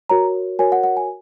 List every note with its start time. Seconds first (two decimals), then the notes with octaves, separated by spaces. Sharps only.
0.10 F#4 A#4 C#5 A#5
0.59 F#4 A#4 C#5 G#5
0.72 F#5
0.84 F#5
0.97 G#5